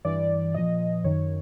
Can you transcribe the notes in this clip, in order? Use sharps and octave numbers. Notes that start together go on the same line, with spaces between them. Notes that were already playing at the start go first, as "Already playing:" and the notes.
G2 E3 D5
A#2 F3 D#5
F#2 D#3 C#5